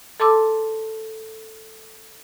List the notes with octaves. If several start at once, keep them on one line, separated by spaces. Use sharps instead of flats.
A4 A5 C6 D6 E6